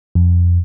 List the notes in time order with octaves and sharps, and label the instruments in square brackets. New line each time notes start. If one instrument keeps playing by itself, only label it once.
[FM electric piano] F2